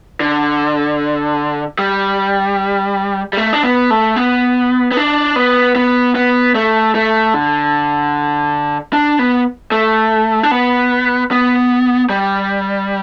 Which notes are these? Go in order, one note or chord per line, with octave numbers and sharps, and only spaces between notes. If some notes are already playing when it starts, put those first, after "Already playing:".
D3
G3
G3
A3
D4
B3
A3
B3
B3
D4
B3
B3
B3
A3
A3
D3
D4
B3
A3
D4
B3
B3
G3